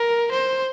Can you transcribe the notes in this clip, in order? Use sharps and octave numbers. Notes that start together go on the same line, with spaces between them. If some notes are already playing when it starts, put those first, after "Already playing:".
Already playing: A#4
C5